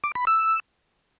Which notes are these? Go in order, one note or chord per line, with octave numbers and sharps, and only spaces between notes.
D6
B5
E6